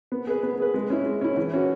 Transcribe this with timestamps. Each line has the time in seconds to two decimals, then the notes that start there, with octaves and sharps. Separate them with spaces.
0.12 B3
0.27 G#4 B4
0.43 B3
0.60 G#4 B4
0.74 G#3
0.90 C#4 E4
1.06 G#3
1.21 C#4 E4
1.37 E3
1.54 C#4 F#4